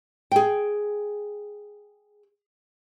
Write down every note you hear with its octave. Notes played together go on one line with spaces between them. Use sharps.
G#4 G5